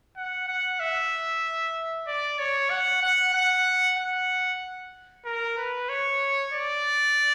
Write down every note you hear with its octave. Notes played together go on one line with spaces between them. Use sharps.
F#5
F#5
E5
D5
C#5
F#5
F#5
F#5
F#5
A#4
B4
C#5
D5